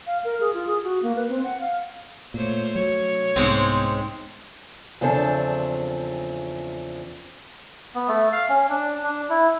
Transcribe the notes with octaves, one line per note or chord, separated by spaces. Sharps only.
F5
A#4
G#4
F4
G#4
F#4
A#3
B4
C4
F#5
F5
A#2 A3 C5 C#5
F#3 C#5
C2 G#2 G#3 B3 C4
E2 C#3 F3 C4 D4 A4
B3
A3
F5
C#4
D4
D4
E4